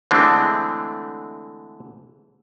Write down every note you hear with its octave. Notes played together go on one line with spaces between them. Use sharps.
D3 E3 G#3 A3 C4 D4